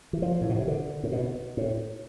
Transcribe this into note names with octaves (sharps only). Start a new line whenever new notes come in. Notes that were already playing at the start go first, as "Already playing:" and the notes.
E3
F3
A2
B2
C3
D3
A2
B2
A2